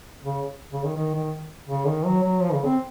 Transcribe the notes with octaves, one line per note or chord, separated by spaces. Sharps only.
C#3
C#3
D#3
D#3
D#3
C#3
D#3
F#3
F#3
F3
C#3
C4